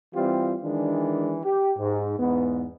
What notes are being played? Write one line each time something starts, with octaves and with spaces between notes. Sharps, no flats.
E3 G3 C4 F4 G4
D#3 E3 G#3 D4
G4
G#2
E2 G#2 B3